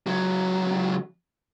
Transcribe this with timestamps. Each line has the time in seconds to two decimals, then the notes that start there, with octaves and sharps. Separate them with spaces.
0.06 C#2 F#3